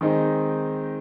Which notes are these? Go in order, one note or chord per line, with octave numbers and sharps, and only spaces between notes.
D#3 G#3 C4 D#4